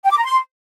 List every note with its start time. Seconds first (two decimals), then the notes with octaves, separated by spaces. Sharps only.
0.05 G5
0.11 D6
0.18 A#5
0.24 C6